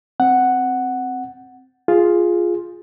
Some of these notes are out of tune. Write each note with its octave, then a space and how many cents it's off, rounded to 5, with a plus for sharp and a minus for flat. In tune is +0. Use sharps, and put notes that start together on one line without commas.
C4 +0 F#5 +0
F4 +0 G#4 +0